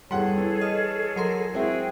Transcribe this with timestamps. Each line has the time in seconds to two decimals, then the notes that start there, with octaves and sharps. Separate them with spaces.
0.11 E2 G3 G#4 A4 C#5 F#5 C6
0.38 E3
0.61 D#5 F6
1.16 F#3 A#4 C6
1.53 G#3 C4 E4 F#4 G#4 G5